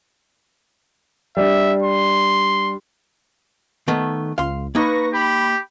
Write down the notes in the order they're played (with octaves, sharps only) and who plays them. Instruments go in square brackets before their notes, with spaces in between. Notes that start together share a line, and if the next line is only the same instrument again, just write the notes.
[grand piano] G3 D4 [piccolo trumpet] E5
[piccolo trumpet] C6
[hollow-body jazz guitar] D#3 A3 B3
[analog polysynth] C#2 [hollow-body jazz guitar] F5 C6
[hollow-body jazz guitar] A#3 D#4 [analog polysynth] B4 C#6 A#6
[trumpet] G4 [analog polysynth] B5